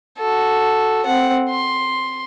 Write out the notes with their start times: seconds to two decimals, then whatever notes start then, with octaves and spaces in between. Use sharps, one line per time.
0.19 F#4 A4
1.06 C4 F#5
1.50 C6